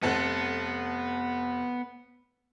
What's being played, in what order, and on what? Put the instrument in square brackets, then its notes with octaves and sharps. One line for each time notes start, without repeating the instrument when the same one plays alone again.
[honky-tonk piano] F1 A4 F#5 [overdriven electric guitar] B3